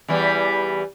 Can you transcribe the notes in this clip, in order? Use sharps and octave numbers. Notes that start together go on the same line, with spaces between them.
E2 E3 G3